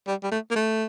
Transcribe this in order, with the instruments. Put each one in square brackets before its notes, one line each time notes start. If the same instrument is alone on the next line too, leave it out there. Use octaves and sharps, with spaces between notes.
[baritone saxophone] G3
G3
A3
A#3
A3